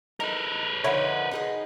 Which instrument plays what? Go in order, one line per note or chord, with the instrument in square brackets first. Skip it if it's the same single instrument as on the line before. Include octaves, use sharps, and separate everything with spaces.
[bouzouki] D#4 E4 [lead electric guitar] A#4 B4
[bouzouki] D3 F3 D#4 [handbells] C#5 E5 B5
[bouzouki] D#4 G4 G#4